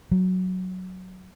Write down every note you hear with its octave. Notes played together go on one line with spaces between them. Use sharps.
F#3